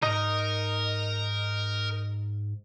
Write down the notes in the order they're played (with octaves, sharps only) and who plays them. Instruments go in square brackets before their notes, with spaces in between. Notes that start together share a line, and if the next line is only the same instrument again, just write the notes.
[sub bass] G#2 [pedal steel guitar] D#4 D#5 [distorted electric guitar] A#4